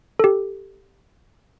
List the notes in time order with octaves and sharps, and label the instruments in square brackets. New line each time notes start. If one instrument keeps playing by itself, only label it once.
[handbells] G4 A4